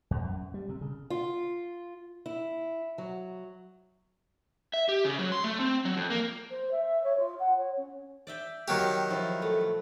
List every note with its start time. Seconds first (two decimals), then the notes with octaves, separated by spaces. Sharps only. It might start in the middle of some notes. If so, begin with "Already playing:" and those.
0.11 E2
0.24 F#2
0.54 G3
0.69 C3
0.81 C#3
1.10 F4
2.26 E4
2.98 F#3
4.74 E5
4.89 G4
5.05 C#3
5.19 F#3
5.32 C6
5.44 A3
5.60 C4
5.85 F#3
5.97 F2
6.10 A#3
6.50 C5
6.71 E5
7.03 C#5
7.17 F4
7.39 F#5
7.56 C#5
7.76 C#4
8.27 D5 E5 G5
8.68 D#3 F#3 G4
9.10 F3 E4
9.42 A3